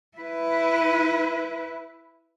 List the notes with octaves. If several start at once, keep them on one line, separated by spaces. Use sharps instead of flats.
E4 B4